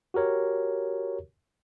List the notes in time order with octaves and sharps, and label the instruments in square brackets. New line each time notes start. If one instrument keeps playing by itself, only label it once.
[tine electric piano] F#4 G4 A#4 C#5